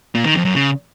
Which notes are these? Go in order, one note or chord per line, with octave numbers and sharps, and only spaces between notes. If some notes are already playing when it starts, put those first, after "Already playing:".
A#2
D#3
F2
F#2
C#3